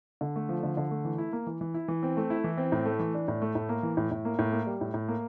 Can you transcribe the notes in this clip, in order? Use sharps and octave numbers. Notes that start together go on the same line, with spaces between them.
D3
A3
F3
D3
D3
A3
E3
E4
A#3
E3
E3
E4
E3
C4
A3
E4
E3
C4
A2
A3
E3
D4
A2
A3
A2
A#3
E3
A2
A2
A#3
A2
A#3
G3
A2
A2
A#3